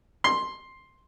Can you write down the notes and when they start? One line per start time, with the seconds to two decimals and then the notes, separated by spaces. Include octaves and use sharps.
0.24 C6